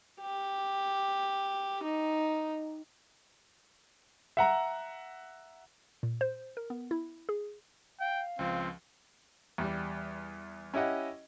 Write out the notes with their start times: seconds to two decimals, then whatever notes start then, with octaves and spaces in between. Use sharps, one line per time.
0.21 G4
1.83 D#4
4.37 E5 F#5 A#5
6.03 A#2
6.21 C5
6.57 A#4
6.70 B3
6.91 E4
7.29 G#4
8.00 F5 G5
8.39 C#2 F3 C4
9.58 E2 G3
10.74 C#4 E4 G4 D#5 F#5